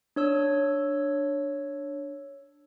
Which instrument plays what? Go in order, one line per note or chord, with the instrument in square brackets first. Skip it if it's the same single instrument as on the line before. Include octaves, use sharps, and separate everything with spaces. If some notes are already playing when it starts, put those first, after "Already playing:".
[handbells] D4 C#5 E6